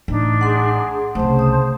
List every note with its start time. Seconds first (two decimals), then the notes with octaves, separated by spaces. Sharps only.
0.08 A1 D4 D#4
0.41 G#4 F#5 C6
1.15 C2 C#3 A3 C5 A5
1.39 D#6